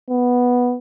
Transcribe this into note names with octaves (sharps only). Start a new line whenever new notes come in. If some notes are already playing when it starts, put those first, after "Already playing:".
B3